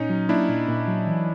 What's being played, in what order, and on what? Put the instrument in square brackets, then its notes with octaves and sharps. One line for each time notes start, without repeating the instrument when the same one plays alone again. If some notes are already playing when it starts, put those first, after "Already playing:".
Already playing: [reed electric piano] A#2 [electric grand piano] C#4 D#4
[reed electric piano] F#3
[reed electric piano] A#3 [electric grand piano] D4 E4
[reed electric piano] A#2
A#2
F#3
E3